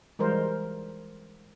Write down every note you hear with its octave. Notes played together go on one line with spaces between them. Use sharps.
E3 G3 G#3 A#4 C5